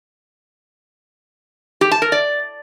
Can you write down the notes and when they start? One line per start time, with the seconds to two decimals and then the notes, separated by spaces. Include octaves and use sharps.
1.81 G4
1.91 A5
2.02 A#4
2.12 D5